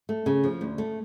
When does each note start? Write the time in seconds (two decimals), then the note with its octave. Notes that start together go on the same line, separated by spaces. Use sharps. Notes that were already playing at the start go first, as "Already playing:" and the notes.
0.09 A3
0.26 C#3
0.44 F3
0.61 D2
0.78 A3